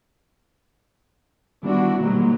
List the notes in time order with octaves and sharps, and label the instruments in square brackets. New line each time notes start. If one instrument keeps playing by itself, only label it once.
[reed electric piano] D#3 G3 B3 [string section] D4 E4 F#4
[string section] G#2 F#3 A#3 [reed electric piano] B2 D#3 G3